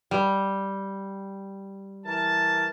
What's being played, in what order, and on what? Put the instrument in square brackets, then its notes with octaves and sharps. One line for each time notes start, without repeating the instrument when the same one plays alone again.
[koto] G3
[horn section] E3 A#4 A5